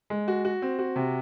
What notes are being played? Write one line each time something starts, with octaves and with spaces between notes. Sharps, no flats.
G#3
F#4
F#4
C4
F#4
C3